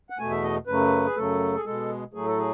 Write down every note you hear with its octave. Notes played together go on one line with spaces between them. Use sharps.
F#5
E2 B2 A3 G#5
E5
D#5
F#2 C#3 F#3 A3 B4
G#4
F#2 C#3 F#3 A3 A4
G#4
B2 G#3 A4
A2 F#3 A3 G#4
A4
G#4